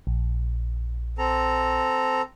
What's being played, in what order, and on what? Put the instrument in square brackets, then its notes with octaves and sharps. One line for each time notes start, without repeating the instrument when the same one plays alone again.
[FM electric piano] A#1
[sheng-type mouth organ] C4 A4 A#5